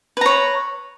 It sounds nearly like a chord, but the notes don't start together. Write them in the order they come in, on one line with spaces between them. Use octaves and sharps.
B4 A#5 C#5